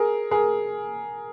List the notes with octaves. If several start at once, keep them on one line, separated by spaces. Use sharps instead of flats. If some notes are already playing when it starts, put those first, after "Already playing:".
Already playing: G#4 A#4
G#4 A#4